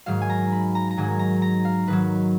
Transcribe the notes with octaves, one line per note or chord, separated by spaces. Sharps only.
G#2 D#3 F#3 F5
G#5
A#5
B5
A#5
A#5
G#2 D#3 F#3 G#5
A#5
A#5
F5
G#2 D#3 F#3 B4